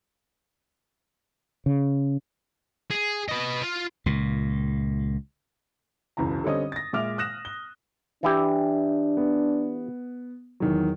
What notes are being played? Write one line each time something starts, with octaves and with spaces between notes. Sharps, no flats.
C#3
G#4
B4 D#5
F4
C#2 A#2
E1 C#2 F#2 E3 A#5
D3 G3 C4 C#4 D#5 D#6
A6 A#6
A#2 G#3 E5 D6 F6 F7
D#6 F#6 A#6 E7
G7
E3 D4 E4 G4
B3
E2 D#3 F#3